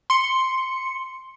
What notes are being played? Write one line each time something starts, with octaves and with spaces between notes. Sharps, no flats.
C6 C#7